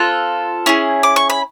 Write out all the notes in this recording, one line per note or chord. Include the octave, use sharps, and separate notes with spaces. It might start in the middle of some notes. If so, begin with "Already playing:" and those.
Already playing: C4 F4 A4 F#6
C#4 E4 G#4
D6
C#6
B5